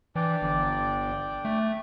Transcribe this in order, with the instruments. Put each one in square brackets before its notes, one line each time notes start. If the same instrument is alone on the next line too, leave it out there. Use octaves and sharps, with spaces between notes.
[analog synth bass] E3 [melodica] D4 D5 G5
[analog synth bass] G1
A3